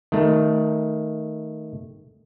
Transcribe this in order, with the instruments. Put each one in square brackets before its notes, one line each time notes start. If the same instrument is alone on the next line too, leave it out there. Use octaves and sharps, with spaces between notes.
[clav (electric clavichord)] D#3 A3